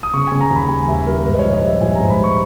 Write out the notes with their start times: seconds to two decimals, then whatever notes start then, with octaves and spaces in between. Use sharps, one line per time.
0.03 D#6
0.14 C#3 C#6
0.27 C#3 G#5
0.41 A#5
0.51 D#2 B5
0.69 G3 G#5
0.88 D#2 E5
1.07 G3 A#4
1.25 G#2 B4
1.35 D#5
1.39 A#1 C#5
1.53 D#5
1.63 G3 E5
1.81 A#1 G#5
1.95 A#5
2.00 G#2
2.10 B5
2.19 G3 C#6